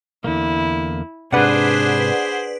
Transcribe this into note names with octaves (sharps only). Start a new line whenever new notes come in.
E2 D3 A#3 E4
G#2 C3 D4 G#4 B4 C5 D5 F#5